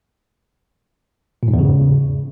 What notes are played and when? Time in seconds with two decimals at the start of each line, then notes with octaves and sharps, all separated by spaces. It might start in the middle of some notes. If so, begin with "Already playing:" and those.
1.43 A#2
1.48 G#2
1.53 E2
1.59 C#3